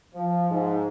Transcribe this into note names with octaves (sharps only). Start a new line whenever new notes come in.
F3
G#2